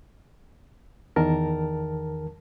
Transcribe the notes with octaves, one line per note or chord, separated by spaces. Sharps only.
E2 D#3 A#4 A5